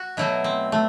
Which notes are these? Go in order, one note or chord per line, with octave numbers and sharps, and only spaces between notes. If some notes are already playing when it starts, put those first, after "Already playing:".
Already playing: F#4
B2 F#3 A3 E4
C4
A3